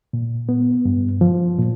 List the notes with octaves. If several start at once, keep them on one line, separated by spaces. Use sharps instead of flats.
A#2
B3
G2
F3
A#2